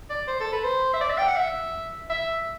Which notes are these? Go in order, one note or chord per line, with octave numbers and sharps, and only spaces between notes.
D5
C5
A4
B4
C5
E5
D5
E5
G5
F#5
E5
E5